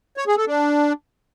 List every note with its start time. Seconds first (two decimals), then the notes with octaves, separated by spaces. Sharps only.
0.17 C#5
0.27 G#4
0.37 A4
0.47 D4